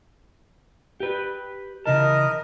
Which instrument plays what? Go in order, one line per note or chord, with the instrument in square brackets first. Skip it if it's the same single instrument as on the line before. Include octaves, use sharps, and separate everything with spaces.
[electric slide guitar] G4 B4
[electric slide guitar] C#3 E3 A5 [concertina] A#4 [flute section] D#5